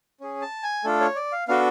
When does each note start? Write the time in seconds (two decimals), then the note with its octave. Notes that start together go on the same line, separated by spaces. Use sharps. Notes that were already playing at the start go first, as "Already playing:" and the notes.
0.21 C#4 G#4
0.42 A5
0.63 G#5
0.84 A3 D4 F4 A4
1.00 C#5
1.16 D5
1.32 F5
1.48 B3 D4 F#4 A4 F5